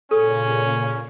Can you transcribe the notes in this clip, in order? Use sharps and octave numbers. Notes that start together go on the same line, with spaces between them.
A#2 C#3 C#4 A4